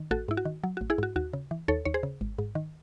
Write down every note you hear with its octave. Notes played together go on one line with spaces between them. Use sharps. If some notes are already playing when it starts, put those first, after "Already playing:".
Already playing: D#3
A1 F#4 A4
G#2 E4
F#4
D#3
F#3
A1 F#4
E4 G#4
G#2 F#4
D#2 F#4
C#3
E3
D#2 A4 C#5
D#2 C#5
G#4 C5
C#3
G#1
G#2
D#3